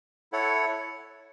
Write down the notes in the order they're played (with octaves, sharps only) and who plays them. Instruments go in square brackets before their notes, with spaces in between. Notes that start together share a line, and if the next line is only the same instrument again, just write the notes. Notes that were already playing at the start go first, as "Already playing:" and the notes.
[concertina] E4 A4 C#5 F#5